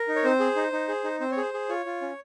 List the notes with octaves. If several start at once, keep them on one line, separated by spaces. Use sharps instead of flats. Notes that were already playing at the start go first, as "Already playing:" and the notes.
Already playing: A#4
D#4
C#5
C4 C5
G#4
D#4
D#4
G#4
D#4
C4 C5
C#5
G#4 C5
G#4
F4 C#5
F4
C#4